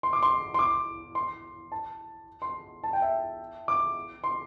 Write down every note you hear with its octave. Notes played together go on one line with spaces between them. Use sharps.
C6
D6
C6
C6
D6
C6
A5
C6
A5
G5
E5
D6
C6